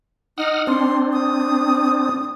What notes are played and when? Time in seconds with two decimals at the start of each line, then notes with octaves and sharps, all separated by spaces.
0.38 D#4 F#5 D#6 F6
0.67 C4 D4 C6
1.13 D#6